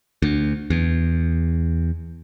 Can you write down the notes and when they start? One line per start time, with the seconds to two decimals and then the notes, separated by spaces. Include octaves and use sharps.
0.22 D2
0.70 E2